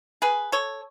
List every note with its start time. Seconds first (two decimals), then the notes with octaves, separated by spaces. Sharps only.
0.22 G#4 B4
0.52 A4 C#5